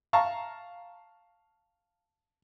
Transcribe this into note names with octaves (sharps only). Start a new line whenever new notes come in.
F5 A5 A#5 C#6